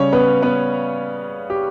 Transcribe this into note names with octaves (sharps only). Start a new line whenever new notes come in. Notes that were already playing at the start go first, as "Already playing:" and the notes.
Already playing: C#3 G3 C#4 C#5
B3 B4
B3 B4
G4